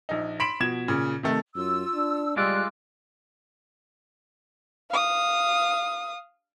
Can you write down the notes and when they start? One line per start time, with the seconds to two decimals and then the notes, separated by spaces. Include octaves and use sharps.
0.09 A#1 D#4
0.40 B5 C6 B6 D7 E7 F#7
0.60 B2 F3 G#6 E7
0.88 A#2 C#3
1.23 C3 D#3 A3 A4
1.55 F#2 F4 E6
1.95 D4
2.37 G3 G#3 F4 D5 E6 F#6
4.90 F5 D#6